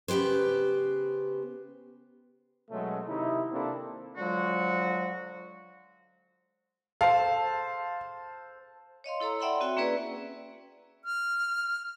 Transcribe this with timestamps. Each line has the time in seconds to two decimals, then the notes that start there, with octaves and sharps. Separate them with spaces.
0.08 C#3 B3 G4 B4 C5
2.71 B2 F#3 G#3 A3 C#4
3.07 C3 D#3 D#4 E4
3.51 C3 A#3 C4 D4 E4 A4
4.17 D3 F3 F#3 G#3 F#4
7.01 A4 C5 F5
9.04 C#5 D#5 F5 C6
9.20 E4 A4 C#5 A#5 E6
9.40 D5 E5 F#5 G5 B5 C6
9.61 C4 F#4 E5 G5
9.77 A#3 C#4 E4 G#4 B4 D5
11.05 F6